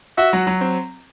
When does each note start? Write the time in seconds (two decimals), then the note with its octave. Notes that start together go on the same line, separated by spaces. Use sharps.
0.18 F#4 E5
0.33 F#3
0.47 F#3
0.61 C4